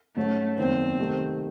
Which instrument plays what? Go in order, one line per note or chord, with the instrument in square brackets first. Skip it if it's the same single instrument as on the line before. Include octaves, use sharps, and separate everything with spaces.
[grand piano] G#2 F#3 C#4 F#4 [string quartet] A3
[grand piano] F#1 E2 D#3 [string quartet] C4
[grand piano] C2 C3 D#3 A3